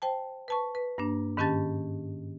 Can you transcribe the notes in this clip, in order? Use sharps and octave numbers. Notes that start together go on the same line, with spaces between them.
C5 G5 A5
B4 A5 C#6
B4
G2 A#3 D4
G#2 D#3 C#4 G4 A5 A6